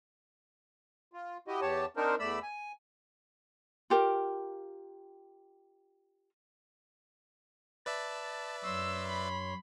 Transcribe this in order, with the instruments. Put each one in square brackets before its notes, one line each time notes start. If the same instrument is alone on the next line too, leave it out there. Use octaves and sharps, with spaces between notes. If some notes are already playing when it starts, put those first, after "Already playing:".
[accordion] F4
E4 F#4 G4 D#5
E2 G4 C#5 A5
C4 D4 D#4 A#4 C5
E2 A3 D5 B5 E6
G#5
[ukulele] F4 G4 A#4
[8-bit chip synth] B4 D5 E5 [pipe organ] A5
[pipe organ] F#2 C#5 C6 [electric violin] E6
[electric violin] B5